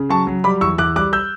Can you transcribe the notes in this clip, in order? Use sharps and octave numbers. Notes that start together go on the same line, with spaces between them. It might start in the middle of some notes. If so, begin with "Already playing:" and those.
Already playing: C#3
F#3 A5 C#6
F#3
G3 B5 D6
E2 C#6 E6
E2 D6 F#6
G3 D6 F#6
E6 G6